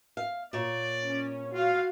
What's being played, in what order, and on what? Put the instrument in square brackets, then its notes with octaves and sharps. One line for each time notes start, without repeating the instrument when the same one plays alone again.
[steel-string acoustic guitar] F5
[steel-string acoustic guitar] A#2 C#5 [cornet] D5
[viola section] C#4
[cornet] F4 [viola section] F#4 F5